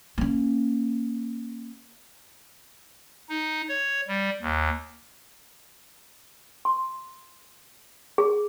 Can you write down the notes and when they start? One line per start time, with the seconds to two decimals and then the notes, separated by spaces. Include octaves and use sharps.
0.18 A#3 C#4
3.29 D#4
3.69 C#5
4.08 G3
4.42 D#2
6.65 C6
8.18 G#4